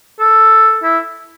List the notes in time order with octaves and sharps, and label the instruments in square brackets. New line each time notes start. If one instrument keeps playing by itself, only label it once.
[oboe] A4
E4